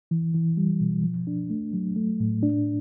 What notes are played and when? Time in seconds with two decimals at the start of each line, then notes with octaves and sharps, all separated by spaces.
0.11 E3
0.34 E3
0.57 G3
0.80 B2
1.04 F3
1.27 D4
1.50 A3
1.73 F#3
1.96 A3
2.20 A2
2.43 D4